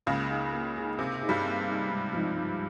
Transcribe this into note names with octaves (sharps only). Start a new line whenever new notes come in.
C#2 C#3 A#3
D#4 G#4
A#3
D#4 G#4
C3 A#3
D#4 G#4
G2 G3
A#3
D#4 G#4
G#2
F3 G#3 D#4
G#2